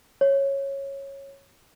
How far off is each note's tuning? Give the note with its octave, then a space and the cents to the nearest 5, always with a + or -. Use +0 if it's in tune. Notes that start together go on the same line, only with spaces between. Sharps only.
C#5 -10